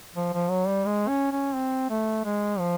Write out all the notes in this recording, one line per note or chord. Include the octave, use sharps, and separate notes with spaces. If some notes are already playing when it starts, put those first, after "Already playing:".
F3
F3
F#3
G3
G#3
C#4
C#4
C4
A3
G#3
F3